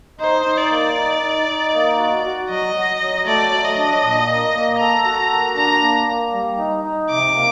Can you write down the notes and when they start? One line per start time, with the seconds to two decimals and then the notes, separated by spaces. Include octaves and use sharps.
0.20 D#4 C5
0.45 D#4
0.58 D5
0.71 A#3
0.97 D#4
1.22 D#4
1.48 D#4
1.74 A#3
1.98 F#4
2.25 F#4
2.49 F#3 D#5
2.75 F#3
3.01 F#3
3.26 A3 D5
3.52 F#3
3.65 D#5
3.78 D4
4.03 A#2
4.29 A#3
4.54 A#3
4.80 A4 A#5
5.05 F#4
5.31 A#3
5.56 D4 A#5
5.82 A#3
6.07 A#3
6.33 G3
6.58 D#4
6.84 D#4
7.09 C3 D6
7.35 A#3